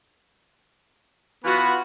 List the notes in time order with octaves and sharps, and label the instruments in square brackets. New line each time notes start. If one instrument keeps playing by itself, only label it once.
[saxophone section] E3 F4 F#4 [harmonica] B3 B5